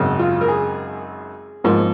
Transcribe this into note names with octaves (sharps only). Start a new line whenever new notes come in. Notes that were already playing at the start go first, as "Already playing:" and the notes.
Already playing: G#1 F#2 C#3
F4
A#4
G#4
G#2 F3 A#3